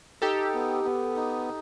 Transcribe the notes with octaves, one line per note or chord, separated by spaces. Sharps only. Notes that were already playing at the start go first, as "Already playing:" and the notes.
D#4 G4 A4
B3
B3
D#4